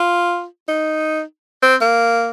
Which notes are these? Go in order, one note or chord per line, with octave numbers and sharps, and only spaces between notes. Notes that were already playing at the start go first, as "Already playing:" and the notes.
Already playing: F4
D#4
C4
A#3